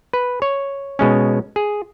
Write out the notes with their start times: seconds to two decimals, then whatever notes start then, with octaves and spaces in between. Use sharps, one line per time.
0.13 B4
0.42 C#5
0.99 B2 G#3 C#4
1.56 G#4